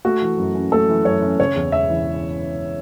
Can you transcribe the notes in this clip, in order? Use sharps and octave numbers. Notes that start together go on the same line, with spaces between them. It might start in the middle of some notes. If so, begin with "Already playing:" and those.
A3 F#4
E3
F#2
C#4
A3 A4
E3
F#2 C#5
C#4
C#3 C#5
E2
E1 E5
E3